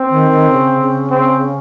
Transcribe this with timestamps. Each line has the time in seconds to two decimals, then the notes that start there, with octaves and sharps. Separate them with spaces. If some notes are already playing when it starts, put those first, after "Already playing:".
Already playing: C4
0.10 D#3
0.31 D#3
0.50 C#3
0.80 C#3
1.10 C4